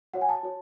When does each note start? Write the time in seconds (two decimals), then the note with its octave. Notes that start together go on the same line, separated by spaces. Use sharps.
0.14 F#4 C#5 F#5
0.21 G#5
0.29 A5
0.43 F#4 C#5